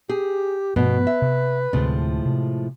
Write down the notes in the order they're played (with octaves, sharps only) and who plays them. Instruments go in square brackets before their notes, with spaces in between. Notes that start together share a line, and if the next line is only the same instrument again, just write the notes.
[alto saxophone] G4 [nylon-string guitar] G#4
[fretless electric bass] G2 F3 A3 [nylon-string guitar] B2 [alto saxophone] B4
[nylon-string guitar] E5
[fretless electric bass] C3
[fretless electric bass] D2 C3 C4 [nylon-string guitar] A2 F3 G#3
[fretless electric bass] C3